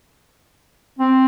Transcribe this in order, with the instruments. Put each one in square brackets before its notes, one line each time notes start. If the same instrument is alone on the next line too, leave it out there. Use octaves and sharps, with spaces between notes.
[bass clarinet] C4